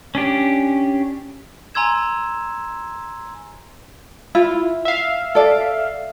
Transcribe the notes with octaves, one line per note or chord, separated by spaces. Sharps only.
C#4 D4 G4
G#5 A#5 C6 E6 G#6 E7
E4 F4
E5 F5
A4 D5